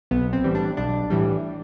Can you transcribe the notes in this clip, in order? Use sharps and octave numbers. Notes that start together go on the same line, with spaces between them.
B1 B3
C4
A2 E3 G3
D4
B1 D4
A2 E3 G3